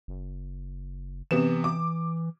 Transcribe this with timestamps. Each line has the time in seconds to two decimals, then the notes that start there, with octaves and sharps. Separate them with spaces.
0.08 F#1
1.31 C3 E3 B3 E7
1.64 D6